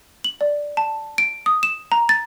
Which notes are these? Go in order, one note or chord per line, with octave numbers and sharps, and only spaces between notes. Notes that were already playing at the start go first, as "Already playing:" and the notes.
F#7
D5
A5
D7
D#6
E7
A#5
A6